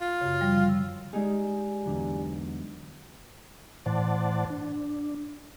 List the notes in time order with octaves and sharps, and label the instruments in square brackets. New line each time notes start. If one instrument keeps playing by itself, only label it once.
[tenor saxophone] F4
[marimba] F#2 C#3
F3 G3 C#5
D3
E6
[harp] G#3 D#4 [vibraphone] G4 D5 G#5 [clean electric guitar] G#4
[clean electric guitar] E2 D3 F#3
[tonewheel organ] A2 E3 C5 D5 F#5 A5
D4